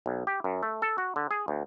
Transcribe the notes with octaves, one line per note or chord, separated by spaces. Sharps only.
B1
G4
F#2
A3
A4
F#4
D3
G#4
D2